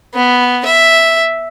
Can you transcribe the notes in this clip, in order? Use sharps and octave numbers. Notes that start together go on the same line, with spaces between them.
B3
E5